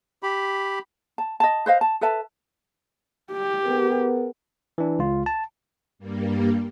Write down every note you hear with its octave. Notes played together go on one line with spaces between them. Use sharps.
G4 B5
A5
D#5 A5
B4 C5 D#5 F5
A5
A4 B4 E5 A5
G4
B3 G#4 A#4
E3 D4
C#2 F4
A5
G2 G3 A#3